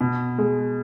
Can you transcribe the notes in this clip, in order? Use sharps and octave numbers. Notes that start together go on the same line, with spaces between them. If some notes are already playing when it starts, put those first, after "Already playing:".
B2
G#3